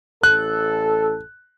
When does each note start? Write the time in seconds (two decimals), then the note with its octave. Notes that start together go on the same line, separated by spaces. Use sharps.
0.23 A1 A4 F#6